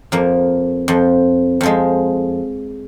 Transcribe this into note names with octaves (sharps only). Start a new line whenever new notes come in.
F2 F3 A#3
F2 F3
F2 F3 G#3